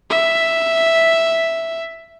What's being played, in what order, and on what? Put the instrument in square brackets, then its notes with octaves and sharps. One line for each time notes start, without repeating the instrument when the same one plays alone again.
[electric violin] E5